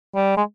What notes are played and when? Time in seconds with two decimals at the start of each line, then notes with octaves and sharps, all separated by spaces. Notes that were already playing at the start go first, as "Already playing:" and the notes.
0.15 G3
0.37 G#3